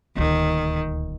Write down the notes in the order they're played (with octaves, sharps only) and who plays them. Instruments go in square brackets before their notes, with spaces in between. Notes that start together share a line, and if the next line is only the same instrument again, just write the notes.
[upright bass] D#1 D2 [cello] D#3